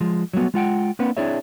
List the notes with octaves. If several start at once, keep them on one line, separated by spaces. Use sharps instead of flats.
F3 G#3
F#3 G3 A3 B3 F#4
G#3 F4 F#5 G5
A#3 C4 D4 B4 F#5
C4 D4 E4 G#4 C#5 E5